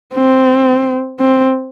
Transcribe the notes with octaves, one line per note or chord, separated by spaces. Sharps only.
C4
C4